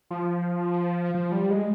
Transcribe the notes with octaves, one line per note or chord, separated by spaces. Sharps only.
F3
F3
G3
G#3